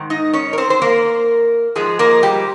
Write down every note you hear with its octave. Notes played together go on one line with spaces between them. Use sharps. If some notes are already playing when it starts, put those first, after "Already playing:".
Already playing: G#2 D#3
D#4 D#5
C#4 C#5
A#4
C4 C5
C5
A#3 A#4
G#2 F3 G#3 G#4
A#3 A#4
G3 G4